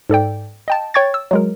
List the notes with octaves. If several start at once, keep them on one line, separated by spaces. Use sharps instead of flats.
G#2 A4 D5 G5
D#5 G5 A5
C#5 G5 C#6 G#6 A6
E6
F#3 G#3 A#4